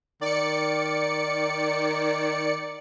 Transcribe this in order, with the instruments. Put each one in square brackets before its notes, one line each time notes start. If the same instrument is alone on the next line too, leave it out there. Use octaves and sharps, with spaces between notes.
[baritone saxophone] D#3 [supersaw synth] D5 C#7